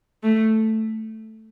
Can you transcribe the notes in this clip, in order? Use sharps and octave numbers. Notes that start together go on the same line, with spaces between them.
A3